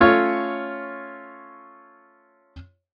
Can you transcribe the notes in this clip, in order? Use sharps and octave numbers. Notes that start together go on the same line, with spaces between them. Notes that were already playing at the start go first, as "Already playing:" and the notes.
A3 C#4 F4 C#5